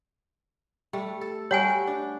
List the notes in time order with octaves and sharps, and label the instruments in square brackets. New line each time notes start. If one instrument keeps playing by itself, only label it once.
[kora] G3 A3
A4
[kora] G3 A3 F#4 [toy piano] C#5 F#5 G#5
[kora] D4